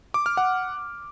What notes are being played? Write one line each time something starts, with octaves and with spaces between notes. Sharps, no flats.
D6
F6
F#5